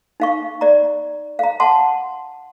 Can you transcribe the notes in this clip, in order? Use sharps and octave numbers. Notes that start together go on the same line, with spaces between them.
D#4 F5 C#6
D5 A#5
F5 A#5
F#5 A5 C6